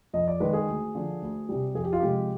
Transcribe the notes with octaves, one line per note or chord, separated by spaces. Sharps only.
F2 D#5
D5
D#3 G#3 B4
G#4
D2
D3 F3
D2
C3 G3
F2 G#4
G4
F4
C3 F3 G#3 G4